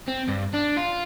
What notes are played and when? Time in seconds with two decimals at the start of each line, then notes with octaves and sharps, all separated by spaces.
0.08 C4
0.28 G2
0.53 D4
0.77 F4